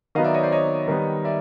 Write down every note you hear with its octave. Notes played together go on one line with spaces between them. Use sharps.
D#3 F#3 B3 D#5 F5
D5 E5
C#5 D#5
C5 D5
C#5 D#5
D#3 G3 B3
D5 E5